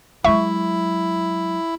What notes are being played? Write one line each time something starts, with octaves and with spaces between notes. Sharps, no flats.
F#3 G#3 E4 E5 C#6